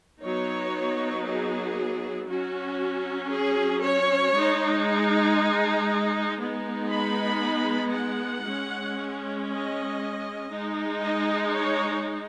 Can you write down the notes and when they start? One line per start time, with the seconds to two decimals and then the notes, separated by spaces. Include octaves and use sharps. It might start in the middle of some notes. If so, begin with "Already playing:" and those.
0.23 F#3 B3 D#4 C#5
1.26 G#4
2.28 F#3 C#4 F#4
3.31 G#4
3.82 C#5
4.34 G#3 D#4
6.40 G#3 B3 D#4
6.91 B5
7.94 F#5
8.45 G#3 C#4
9.48 D#5
10.51 G#3 D#4
11.02 D#5
11.53 C#5